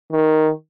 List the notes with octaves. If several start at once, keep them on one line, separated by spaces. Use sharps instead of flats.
D#3